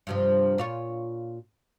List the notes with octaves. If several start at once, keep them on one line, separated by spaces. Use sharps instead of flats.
G2 C3 F3
A#2 F4 C#5